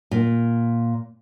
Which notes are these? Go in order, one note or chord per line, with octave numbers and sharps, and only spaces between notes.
A#2